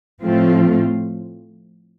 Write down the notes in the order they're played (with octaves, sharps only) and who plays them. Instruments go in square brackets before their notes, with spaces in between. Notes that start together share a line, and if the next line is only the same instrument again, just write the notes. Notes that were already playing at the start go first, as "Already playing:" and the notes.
[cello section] A2 F3 A3 C4 F4